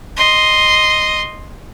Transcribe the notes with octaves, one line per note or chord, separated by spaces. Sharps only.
D#5 C6